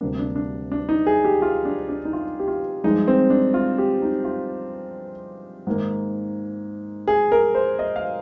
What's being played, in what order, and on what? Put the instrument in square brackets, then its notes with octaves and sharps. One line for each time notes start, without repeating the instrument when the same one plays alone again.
[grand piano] D2 C3 G3 A#3 D4
D4
D4
D4
D#4
G#4
G4
F4
D4
D4
D#4
F4
G4
F4
G2 F3 G#3 D#4
C4
D4
F4
G4
D#4
F4
G#2 D#3 A#3
G#4
A#4
C5
D#5
F5